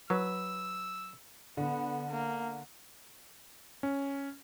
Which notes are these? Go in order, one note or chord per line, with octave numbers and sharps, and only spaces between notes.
F#3 B4 E6
D3 B3
A#3
C#4